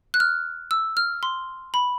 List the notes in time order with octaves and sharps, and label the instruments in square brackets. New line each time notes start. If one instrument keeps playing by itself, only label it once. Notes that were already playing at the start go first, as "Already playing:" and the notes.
[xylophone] F#6
F6
E6
F6
C6
B5